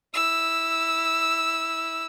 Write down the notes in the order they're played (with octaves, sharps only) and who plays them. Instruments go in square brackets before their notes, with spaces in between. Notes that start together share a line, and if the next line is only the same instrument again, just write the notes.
[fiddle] E4 E6